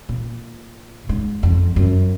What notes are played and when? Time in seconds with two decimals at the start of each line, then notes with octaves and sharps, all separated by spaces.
0.09 A#2
1.09 G#2
1.43 F2
1.76 F#2